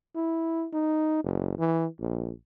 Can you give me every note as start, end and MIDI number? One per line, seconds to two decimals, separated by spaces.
0.15 0.67 64
0.73 1.20 63
1.24 1.55 30
1.58 1.86 52
2.00 2.31 34